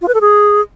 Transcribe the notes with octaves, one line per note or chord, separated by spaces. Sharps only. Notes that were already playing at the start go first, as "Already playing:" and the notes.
F4
B4
A4
G#4